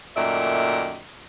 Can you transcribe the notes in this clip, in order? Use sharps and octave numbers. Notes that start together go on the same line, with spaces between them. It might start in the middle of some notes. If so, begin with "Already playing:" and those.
F#2 A#2 D#3 A3 D5 E5